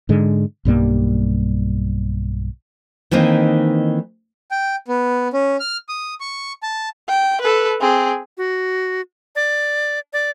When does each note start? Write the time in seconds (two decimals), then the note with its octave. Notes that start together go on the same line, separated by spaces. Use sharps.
0.09 G#2 D3 G#3
0.65 B1 G2 G3 A#3
3.11 D#3 E3 A#3 C4 D#4
4.51 G5
4.88 B3
5.33 C#4
5.60 F6
5.89 D#6
6.20 C#6
6.63 A5
7.08 G5
7.41 A4 B4
7.81 C4 G#4
8.38 F#4
9.36 D5
10.13 D5